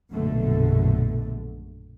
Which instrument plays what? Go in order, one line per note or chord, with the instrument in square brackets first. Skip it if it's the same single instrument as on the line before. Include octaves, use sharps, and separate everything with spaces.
[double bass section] A#1 F#2 B2 D3 A3